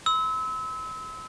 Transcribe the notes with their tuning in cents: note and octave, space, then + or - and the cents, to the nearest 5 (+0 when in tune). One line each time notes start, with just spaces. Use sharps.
C6 -40 E6 -30